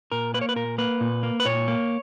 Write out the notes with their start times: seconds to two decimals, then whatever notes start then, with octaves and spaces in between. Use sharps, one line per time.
0.12 A#2 A#4
0.34 A#3 B4
0.41 C#5
0.49 B4
0.56 A#2 A#4
0.78 A#3 B4
1.01 A#2
1.23 A#3
1.40 B4
1.45 A#2 C#5
1.68 A#3